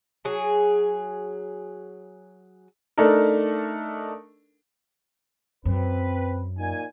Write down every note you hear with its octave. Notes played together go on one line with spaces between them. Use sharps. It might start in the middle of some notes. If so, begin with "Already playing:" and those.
F#3 G#4
A3 D4 D#4 A4 A#4
F#2 C4 B4
A#2 D#4 G#5